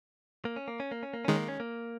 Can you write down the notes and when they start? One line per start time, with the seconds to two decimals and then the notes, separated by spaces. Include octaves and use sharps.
0.45 A#3
0.56 C#4
0.68 A#3
0.80 C#4
0.91 A#3
1.03 C#4
1.14 A#3
1.25 D#3 G#3 C#4
1.36 A#3
1.48 C#4
1.60 A#3